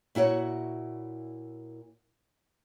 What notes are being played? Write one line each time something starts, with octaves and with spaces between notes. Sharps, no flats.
A#2 E4 F#4 C#5